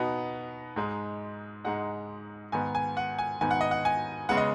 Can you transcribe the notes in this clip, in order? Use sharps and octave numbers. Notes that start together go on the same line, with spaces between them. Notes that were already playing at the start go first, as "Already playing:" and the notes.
Already playing: B2 B3 D#4
G#2 G#3 D#4
G#2 G#3 D#4 F#5
G#2 D#3 B3 G#5
G#5
F#5
G#5
G#2 D#3 B3 G#5
F#5
D#5
F#5
G#5
C#3 G#3 B3 F#5
D#5